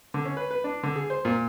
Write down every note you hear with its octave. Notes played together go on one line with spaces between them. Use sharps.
D3
C#4
B4
B4
D4
D3
G#4
C5
A#2